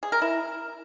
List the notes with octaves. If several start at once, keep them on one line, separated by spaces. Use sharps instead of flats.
G#4
A#4
E4